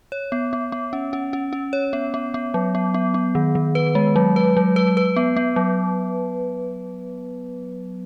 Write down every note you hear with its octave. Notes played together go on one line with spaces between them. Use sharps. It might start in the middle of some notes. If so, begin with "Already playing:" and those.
C#5
B3
B3
B3
C#4
C#4
C#4
C#4
C#5
B3
B3
B3
F#3
B3
B3
B3
D#3
D#3
B4
G#3
F#3
B4
F#3
B4
B4
B3
B3
F#3